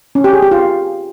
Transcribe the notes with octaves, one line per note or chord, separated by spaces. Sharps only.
C#4
G4
G#4
G4
F4